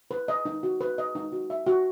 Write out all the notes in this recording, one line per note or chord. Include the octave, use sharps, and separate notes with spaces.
B4
D#5
D#4
F#4
B4
D#5
D#4
F#4
E5
F#4